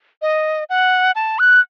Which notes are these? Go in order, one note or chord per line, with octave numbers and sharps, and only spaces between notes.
D#5
F#5
A5
F#6